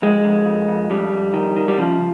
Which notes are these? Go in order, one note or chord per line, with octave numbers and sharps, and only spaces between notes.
F2 G#3
F2
F2
F2
F2 G3
F2
D#3
D#3
G3
C#3 F3